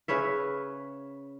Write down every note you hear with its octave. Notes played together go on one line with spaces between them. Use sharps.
C#3 B4 C#5 E5